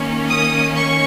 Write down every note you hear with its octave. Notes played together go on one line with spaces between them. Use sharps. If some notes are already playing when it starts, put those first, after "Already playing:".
Already playing: D#3 A#3 C#4
D#6
C#6